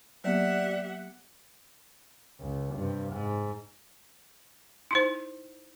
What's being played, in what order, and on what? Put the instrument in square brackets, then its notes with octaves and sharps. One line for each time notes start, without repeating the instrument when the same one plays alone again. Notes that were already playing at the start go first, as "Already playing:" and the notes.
[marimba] F#3 A#3 B3 [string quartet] G4 E5 F#5 [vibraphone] D5
[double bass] C#2
G2 C3
G#2
[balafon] D#4 E4 C5